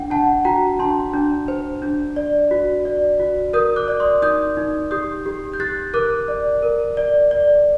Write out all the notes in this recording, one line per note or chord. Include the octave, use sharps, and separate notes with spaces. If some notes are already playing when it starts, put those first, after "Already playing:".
Already playing: D4 F#5 G5
D4 F#5 A5
F#4 G5 A#5
D4 A5 C6
D4
C5
D4
D5
F#4
D5
F#4
A#4 D#6 G6
D6 F#6
D5
C6 D#6
D#4 D#6 G6
D#4
G4 D#6 G6
G4
G6
G4 F#6 A6
A#4 D6 F#6
D5
A#4
D5
D5